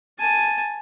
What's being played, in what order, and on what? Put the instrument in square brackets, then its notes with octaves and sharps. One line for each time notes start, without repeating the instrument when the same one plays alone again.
[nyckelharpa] G#5 A5